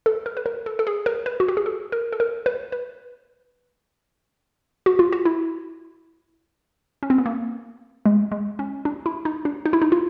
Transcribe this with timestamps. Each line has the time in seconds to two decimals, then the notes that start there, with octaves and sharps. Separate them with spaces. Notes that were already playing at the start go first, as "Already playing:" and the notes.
0.06 A4
0.26 A#4
0.37 B4
0.46 A#4
0.66 A4
0.79 A4
0.87 G#4
1.06 A#4
1.26 B4
1.40 F#4
1.48 G4
1.57 G#4
1.66 A4
1.92 A#4
2.13 A4
2.20 A#4
2.46 B4
2.72 B4
4.86 F#4
4.99 F4
5.12 F#4
5.25 E4
7.03 C#4
7.10 C4
7.18 B3
7.26 A#3
8.06 G#3
8.32 G#3
8.59 C#4
8.85 D4
9.06 E4
9.25 D#4
9.45 D4
9.66 D#4
9.73 E4
9.82 D#4
9.92 F4